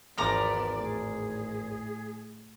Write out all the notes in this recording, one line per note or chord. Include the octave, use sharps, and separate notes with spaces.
G#1 E2 F3 B3 D5 A#5 D6
A2 G#4